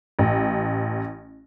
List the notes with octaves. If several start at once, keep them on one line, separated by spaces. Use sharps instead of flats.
A1